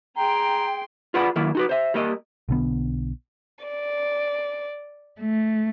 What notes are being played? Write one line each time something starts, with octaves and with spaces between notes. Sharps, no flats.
G#4 G5 A#5 C6
F4 G#4 B4 D5 F#5 B5
D#3 F#3 A#3 E4
D#4 F#4 B4
C5 E5
G3 A#3 A#4 D#5
B1 D3 B3
D5
A3